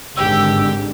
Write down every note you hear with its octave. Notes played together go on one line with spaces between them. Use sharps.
G#1 G#2 D3 G4 E6